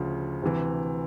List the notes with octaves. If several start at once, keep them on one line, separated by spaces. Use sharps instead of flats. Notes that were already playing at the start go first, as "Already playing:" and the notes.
Already playing: D2 C#3 F3
D2 C3 E3